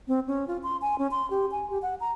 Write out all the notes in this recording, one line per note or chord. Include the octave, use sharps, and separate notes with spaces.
C4
C#4
F4
C6
G#5
C#4
C6
G4
G#5
G4
F#5
A#5